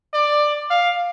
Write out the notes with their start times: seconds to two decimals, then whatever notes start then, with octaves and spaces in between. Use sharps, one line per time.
0.14 D5
0.70 F5